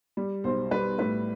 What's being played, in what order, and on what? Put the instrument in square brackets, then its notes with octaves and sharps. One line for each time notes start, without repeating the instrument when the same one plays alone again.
[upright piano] G3
B1 C5
G3 B4
A2 B4